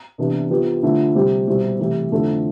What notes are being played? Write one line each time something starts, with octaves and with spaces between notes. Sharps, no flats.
C3 E3 B3 D4 G4
F3 B3 E4 G4
D3 F3 A3 E4
C3 G3 C4 G4
B2 G3 C4 E4
C3 E3 A3 E4 G4
F2 D3 A3 E4 A4